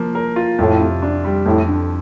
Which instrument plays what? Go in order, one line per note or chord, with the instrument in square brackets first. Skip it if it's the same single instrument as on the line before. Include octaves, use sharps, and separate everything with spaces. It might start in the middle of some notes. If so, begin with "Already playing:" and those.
Already playing: [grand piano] F3 A#3
A#4
F4
[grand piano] F2 [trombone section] A2
[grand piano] C3
D4
G3
[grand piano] F2 [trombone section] A2
[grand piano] D3